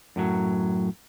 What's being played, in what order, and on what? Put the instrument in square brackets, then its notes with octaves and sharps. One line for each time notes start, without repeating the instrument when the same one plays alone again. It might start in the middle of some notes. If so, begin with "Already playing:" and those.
[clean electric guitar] F#2 A2 F#3